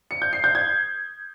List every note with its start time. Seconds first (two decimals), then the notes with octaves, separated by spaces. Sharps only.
0.11 C#7
0.22 G6
0.33 C7
0.44 G6
0.55 G#6